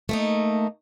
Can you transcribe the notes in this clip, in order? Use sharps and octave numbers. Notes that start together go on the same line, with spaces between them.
A3 A#3 D#4